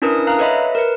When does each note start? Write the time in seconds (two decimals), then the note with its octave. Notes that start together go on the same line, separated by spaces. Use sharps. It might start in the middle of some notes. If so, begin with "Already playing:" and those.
0.02 C#4 D4 E4 A#4 B4 D#6
0.27 F5 A#5 F6 F#6
0.38 A4 B4 C#5 D#5 E5 B5
0.75 A#4 B4